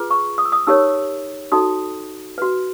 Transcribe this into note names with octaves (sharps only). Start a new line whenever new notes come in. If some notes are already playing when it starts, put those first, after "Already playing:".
Already playing: F4 G#4 B4
C#6
D#6
E6
D#6
D#4 G4 A#4 C#5 E6
D#4 F#4 A4 D#6
F#4 B4